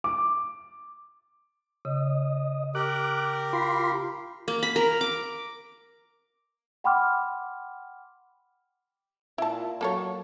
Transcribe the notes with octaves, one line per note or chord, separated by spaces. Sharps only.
D6
C#3 D#5
G4 A#4 D6 F#6
F4 B5 C6
A#3
B5
A#4
D6
F#5 G5 B5 C6 D6 F6
A#2 E4 F4 A5
F#3 A#3 A4 C#5